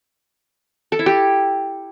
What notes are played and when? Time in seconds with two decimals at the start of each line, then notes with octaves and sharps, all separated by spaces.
0.92 A4
0.99 E4
1.06 G4